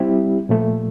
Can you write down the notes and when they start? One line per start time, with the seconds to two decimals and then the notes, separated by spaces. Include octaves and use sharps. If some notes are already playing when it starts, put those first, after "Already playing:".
Already playing: G3 C4 E4 G4
0.49 A#2 F3 A3